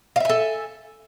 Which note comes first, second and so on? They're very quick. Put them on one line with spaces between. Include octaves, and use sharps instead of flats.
F5 E5 G#5 A4